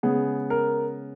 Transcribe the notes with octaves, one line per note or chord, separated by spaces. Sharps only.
C#3 G#3 B3 G#4
A#4